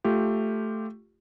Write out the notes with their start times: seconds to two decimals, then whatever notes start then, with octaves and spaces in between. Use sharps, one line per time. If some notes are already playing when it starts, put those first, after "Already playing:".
0.04 A3 F4 G4